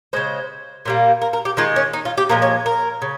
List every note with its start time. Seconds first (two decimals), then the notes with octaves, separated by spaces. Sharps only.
0.13 C#3 G#3 C5
0.85 A#2 G3 A#3
1.22 A#4
1.33 A#4
1.45 G4
1.57 D#3 G#3 F4
1.76 C#4
1.93 D#4
2.05 F4
2.18 G4
2.29 A#2 F3 G#3 A#4
2.42 C#5
2.66 A#4
3.02 C#3